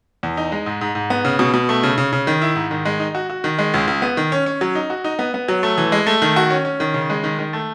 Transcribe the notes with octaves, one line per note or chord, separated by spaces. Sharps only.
E2
D#4
G#3
G#2
G#2
G#2
B3
C#3
B2
B2
A3
C#3
C#3
C#3
D#3
E4
G#2
D#3
G#3
D#4
F#4
F#4
D#3
G#3
C#2
C#2
B3
D#3
C#4
C#4
F#3
D#4
F#4
D#4
B3
B3
F#3
A3
E3
G#3
A3
D#3
F#4
C#4
C#4
D#3
C#3
G#3
D#3
D#3
A3